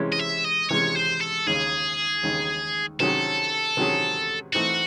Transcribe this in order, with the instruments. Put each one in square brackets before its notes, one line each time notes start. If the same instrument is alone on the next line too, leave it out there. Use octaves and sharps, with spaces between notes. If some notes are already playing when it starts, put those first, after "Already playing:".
Already playing: [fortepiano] C3 E3 G#3 C#4
[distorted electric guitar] D#5
E5
D#5
[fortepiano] C3 E3 G#3 C#4 [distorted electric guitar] C#5
[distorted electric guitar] C5
A4
[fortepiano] D#2 C#3 G#3 D#4 [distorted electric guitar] G#4
[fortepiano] D#2 C#3 G#3 D#4
[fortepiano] C3 D#3 F#3 C#4 G#4 [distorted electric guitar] A4
[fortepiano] C3 D#3 F#3 C#4 G#4
[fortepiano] E3 A3 C4 D#4 [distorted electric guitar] F#4